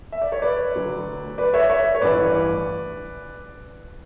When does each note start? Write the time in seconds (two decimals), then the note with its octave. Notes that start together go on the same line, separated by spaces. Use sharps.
0.12 E5
0.22 D5
0.32 C#5
0.42 B4 D5
0.75 D2 D3 F#3
1.38 B4 D5
1.54 C#5 E5
1.69 C#5 E5
1.95 C#5
2.01 A1 G2 E3 B4 D5